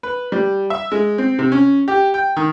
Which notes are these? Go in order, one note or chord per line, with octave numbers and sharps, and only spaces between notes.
B4
G3
E5
G#3
C4
C3
C#4
G4
G5
D#3